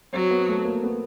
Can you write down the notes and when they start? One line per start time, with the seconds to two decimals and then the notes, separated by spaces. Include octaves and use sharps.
0.13 F#3 C4
0.31 B3
0.49 A3
0.65 A#3
0.84 B3